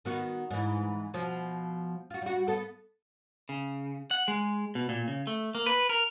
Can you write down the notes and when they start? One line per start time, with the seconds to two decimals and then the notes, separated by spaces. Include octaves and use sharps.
0.05 D#3 B3 F#4
0.51 G#2 E3
1.14 B2 F3
2.10 F4 F#4
2.22 G3 F#4
2.48 B3 A4
3.49 C#3
4.11 F#5
4.28 G#3
4.75 B2
4.89 A#2
5.08 C#3
5.27 A3
5.55 A#3
5.66 B4
5.89 A#4